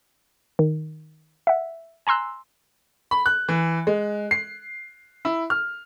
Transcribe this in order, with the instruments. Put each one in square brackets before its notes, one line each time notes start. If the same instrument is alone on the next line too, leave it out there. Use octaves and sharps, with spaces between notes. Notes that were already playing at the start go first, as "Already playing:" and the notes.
[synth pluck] D#3
E5 F#5
G#5 A#5 C6 E6 F#6
[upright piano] B5
F#6
E3
G#3
C7
E4
F6